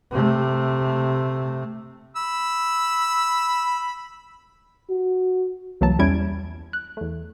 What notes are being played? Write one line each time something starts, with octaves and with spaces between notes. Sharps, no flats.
C3 A3
B5 E6
F#4
C2 E3 F#3 A#3 A5
E2 G3 C#4 E4 G#6 D7
F#6
E2 A3